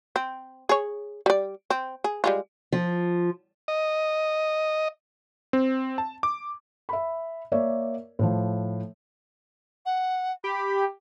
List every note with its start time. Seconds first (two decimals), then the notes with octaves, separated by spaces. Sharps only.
0.16 C4
0.69 G#4 C#5
1.26 G3 D5
1.70 C4
2.04 G#4
2.24 G3 G#3 F4
2.72 F3
3.68 D#5
5.53 C4
5.98 A5
6.23 D6
6.89 E5 B5
7.52 A#3 A#4 C#5 D5 E5
8.19 A2 F3
9.86 F#5
10.44 G4 B5